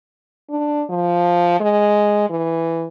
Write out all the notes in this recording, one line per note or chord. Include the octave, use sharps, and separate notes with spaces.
D4
F3
G#3
E3